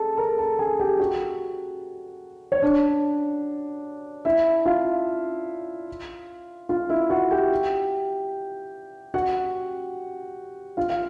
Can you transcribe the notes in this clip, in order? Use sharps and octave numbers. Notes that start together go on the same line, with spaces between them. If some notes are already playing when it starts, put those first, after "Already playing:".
Already playing: G#4 A4 A5
A#4 A#5
A4 A5
G#4 G#5
G4 G5
F#4 F#5
C#5
D4 D5
E4 E5
F4 F5
F4 F5
E4 E5
F#4 F#5
G4 G5
F#4 F#5
F4 F5
F5